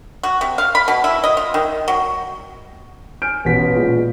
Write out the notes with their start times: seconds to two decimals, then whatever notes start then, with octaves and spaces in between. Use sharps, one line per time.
0.23 F#4
0.41 C3
0.58 F5
0.75 B5
0.88 B2
1.04 E4
1.24 D#5
1.37 F4
1.54 D#3
1.88 F#3
3.22 G#5 F6 G6 D7
3.45 A1 B2 B3 C#4 B6
3.76 A#2 G#3